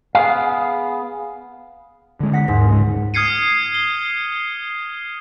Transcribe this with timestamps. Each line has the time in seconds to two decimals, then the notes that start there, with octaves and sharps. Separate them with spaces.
0.15 B3 G#4 F5
2.20 D3 G#3
2.33 F#5 A#6 B6
2.48 D#2 G#2
2.68 C#2 G#3
3.14 D#6 F6 G#6 C7 C#7 D#7
3.74 G7